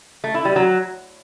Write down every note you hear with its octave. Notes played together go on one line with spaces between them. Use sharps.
A3
E4
G3
F#3